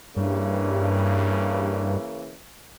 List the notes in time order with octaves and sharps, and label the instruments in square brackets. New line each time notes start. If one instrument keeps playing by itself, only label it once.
[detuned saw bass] G2 [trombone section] C#3 E3 A#3